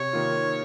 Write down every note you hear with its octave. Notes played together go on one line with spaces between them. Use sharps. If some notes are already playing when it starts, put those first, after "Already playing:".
Already playing: C3 C#5
D#3 A#3 F4